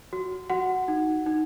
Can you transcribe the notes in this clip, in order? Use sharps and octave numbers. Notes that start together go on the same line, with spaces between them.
F#4
F#4 F#5
D#4
D#4